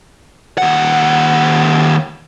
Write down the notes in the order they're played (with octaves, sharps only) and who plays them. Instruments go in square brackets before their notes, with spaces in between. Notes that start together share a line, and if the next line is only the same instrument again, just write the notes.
[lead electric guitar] D#2 F#5